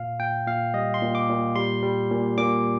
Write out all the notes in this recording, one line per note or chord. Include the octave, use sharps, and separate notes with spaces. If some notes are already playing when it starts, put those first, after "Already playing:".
Already playing: A#2 F5
A#2 G5
A#2 F5
G3 D#5
C6
A#2
D6
A#2
G3 C6
G3
A#2
A#2 D6